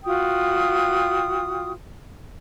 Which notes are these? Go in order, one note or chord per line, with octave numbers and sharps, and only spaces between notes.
F4 F#4 G5 D#6